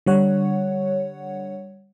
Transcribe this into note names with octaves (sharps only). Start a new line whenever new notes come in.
D3 G3 C#5 F#5